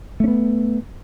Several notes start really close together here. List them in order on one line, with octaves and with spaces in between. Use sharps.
A3 C#4 B3